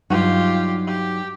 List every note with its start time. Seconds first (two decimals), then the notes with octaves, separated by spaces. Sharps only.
0.10 G2 F#3 D#4 F4 G4
0.87 G4